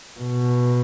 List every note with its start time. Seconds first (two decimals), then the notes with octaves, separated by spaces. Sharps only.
0.21 B2